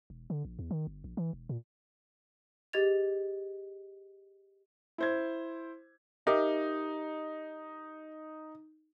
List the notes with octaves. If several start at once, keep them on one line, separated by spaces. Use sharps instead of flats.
E1
D3
A#1
E2
D#3
G1
A#1
E3
E1
A#2
G4 G#4 D#5 G#6 A6 F7
E4 C5 G#6
D#4 G4 A#4 E5